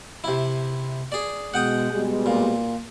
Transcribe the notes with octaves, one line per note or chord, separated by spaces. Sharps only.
C3 E4
G#4 D5
B2 G#3 F#5 G5 D#6
B2 G3 G#3
A#2